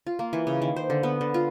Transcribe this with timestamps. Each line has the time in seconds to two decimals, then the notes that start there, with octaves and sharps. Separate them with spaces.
0.07 F4
0.19 A#3
0.33 E3
0.47 C#3
0.62 D#3
0.76 C5
0.90 D3
1.03 B3
1.21 D3
1.34 F4